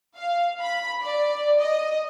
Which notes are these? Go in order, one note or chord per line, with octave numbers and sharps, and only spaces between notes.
F5
B5
D5
D#5